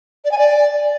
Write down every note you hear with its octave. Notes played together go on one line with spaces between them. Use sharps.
D5
G#5
D5